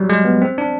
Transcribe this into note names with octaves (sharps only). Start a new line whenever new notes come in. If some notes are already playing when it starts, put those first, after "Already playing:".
Already playing: F#3 G3
G#3
B3
C4
D4